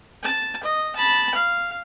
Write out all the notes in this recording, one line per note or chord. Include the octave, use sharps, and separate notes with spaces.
A5
D#5
A5 B5
F5